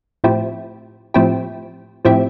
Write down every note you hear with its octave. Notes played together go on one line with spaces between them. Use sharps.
A2 F3 C4 E4 G4
A2 F3 C4 E4 G4
A2 F3 C4 E4 G4